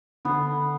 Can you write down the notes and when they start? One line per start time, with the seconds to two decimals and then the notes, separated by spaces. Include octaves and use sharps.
0.25 D3 B3 D4